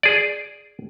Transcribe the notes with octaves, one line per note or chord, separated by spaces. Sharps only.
G#4 D5